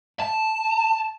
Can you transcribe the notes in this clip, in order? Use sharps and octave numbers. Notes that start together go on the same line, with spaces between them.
A5